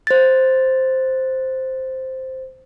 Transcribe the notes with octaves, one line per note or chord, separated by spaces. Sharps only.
C5 A6